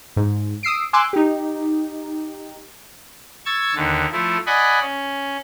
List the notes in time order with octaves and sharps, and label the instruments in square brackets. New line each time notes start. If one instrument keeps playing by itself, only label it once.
[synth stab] G#2
D#6 E6 C7 D7
G#5 C6 D6 E6 F#6
D#4 G4
[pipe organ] C#6 E6 G#6 A6
D#2 D3
F3 A3 E4
D5 D#5 F#5 G#5 B5
C#4